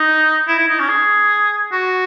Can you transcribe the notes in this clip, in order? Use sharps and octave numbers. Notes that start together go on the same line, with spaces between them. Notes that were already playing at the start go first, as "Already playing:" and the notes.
Already playing: D#4
E4
E4
D#4
C#4
G#4
F#4